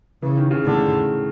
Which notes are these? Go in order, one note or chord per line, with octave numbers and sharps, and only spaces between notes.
C#3 E3
D#3
C#3
A2 D3